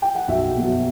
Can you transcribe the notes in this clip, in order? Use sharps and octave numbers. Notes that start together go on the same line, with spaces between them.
G5
F#5
B1 E5
B2 F#3